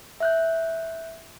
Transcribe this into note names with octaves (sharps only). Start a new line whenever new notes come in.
E5 F#6 G6